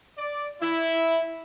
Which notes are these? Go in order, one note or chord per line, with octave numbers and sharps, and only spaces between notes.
D5
E4